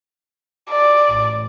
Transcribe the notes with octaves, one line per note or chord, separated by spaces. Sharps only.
D5
A1